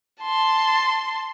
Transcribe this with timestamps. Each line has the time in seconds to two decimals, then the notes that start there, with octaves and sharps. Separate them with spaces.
0.22 A5 C6